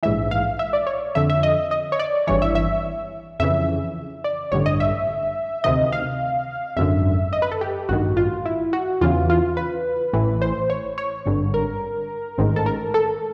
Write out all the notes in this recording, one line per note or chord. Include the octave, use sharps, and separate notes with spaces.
A#1 G#2 E3 E5
F5
E5
D5
C#5
F2 D3 E5
E5
D#5
D#5
C#5
D5
G#1 G2 E3 C#5
E5
E5
F2 C#3 E3 E5
D5
A1 G2 D3 C#5
D#5
E5
D2 C3 D#3 D#5
F5
G#1 F#2 D3 E5
D#5
B4
A4
G4
A1 G2 D#3 F#4
F4
E4
F#4
E2 C#3 E3 F4
F4
B4
A1 A2 E3
C5
C#5
C#5
G#1 G2 D3
A#4
A1 G#2 D#3
A4
A#4
A4